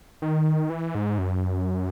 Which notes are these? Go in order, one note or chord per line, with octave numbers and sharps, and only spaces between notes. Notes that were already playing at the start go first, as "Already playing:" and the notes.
D#3
E3
G#2
F#2